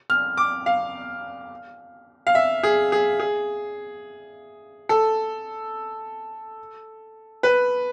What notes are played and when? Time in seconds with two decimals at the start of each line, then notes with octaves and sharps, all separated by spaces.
0.10 F6
0.37 D6
0.66 F5
2.27 F5
2.35 E5
2.63 G#4
2.92 G#4
3.20 G#4
4.89 A4
7.43 B4